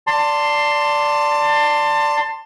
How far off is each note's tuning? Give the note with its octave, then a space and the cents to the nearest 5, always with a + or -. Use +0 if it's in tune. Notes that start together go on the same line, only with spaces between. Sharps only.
D5 -10 A5 +25 C6 +0